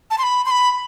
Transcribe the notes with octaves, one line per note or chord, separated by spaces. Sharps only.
A5
C6
B5
C6
B5